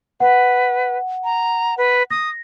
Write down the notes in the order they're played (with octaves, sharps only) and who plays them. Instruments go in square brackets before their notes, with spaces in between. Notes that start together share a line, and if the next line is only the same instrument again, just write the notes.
[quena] B4 [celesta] F#5
[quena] A#5
B4
[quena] D#6 [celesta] A#6